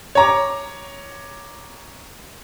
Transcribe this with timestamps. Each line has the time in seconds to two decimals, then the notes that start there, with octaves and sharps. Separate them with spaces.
0.15 C#5 A#5 D6